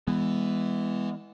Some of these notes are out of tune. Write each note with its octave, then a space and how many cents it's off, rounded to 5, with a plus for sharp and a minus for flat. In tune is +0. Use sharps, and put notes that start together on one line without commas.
E3 +0 G#3 -30 B3 +0